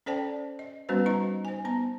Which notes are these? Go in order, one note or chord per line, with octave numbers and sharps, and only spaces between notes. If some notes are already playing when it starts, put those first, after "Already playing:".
C#4 A4 C5 D5 G5 A5
D#5
G3 B3 C#4 F#4 B4 C5
D#4 D#5 A#5
C5 G#5
B3 A#5